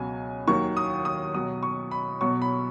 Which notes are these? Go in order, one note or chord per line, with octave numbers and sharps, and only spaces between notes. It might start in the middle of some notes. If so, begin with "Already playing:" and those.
Already playing: C#2 B2 F#3 G#5
D#2 D#3 F#3 C#6
D#6
D#6
B1 B2 F#3 D#6
C#6
B5
B1 B2 F#3 C#6
B5